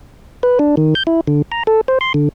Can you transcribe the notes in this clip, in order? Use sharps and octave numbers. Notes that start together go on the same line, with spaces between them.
B4
D4
D#3
G6
E4
D3
A#5
A4
C5
C6
D3